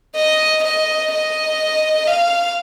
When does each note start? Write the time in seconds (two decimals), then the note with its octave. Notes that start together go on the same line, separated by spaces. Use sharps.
0.16 D#5
0.64 D#5
1.12 D#5
2.07 F5